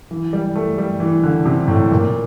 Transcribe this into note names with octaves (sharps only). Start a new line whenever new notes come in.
E3
G3
A3
G3
E3
D3
C3
A2
A#2